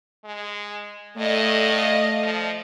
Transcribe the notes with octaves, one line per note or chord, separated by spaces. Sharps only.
G#3
A2 A3 D5 D#5 F5
F3